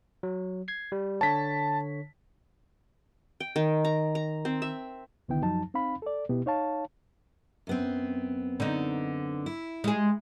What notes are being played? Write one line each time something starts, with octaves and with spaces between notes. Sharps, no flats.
F#3
G#6 C7
G3
D3 C#5 A5 B6
G5
D#3
A#5
A#5
C4
E5
C2 D3 D#3 B3 E4 G5
F#2 F3 F#3 D#4 A5
C4 D#4 F5 B5
A4 D5
B2 B3 E4 G4
D#4 C#5 F5 A5
F#2 B3 C4
D3 D#4
E4
G#3 G#4